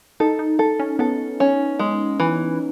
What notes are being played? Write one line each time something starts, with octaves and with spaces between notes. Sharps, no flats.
D#4 A4
D#4
A4
C#4
B3 A4
C#4
G#3
E3